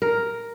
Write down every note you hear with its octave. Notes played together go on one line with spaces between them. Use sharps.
A#4